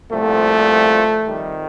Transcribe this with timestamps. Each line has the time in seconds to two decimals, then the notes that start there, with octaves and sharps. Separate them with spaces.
0.11 C2 A#2 F3 A3
1.25 F2 D#3 G3